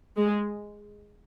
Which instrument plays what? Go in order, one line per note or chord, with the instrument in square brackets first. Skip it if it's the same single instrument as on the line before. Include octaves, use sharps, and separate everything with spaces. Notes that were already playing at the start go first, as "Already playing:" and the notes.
[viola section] G#3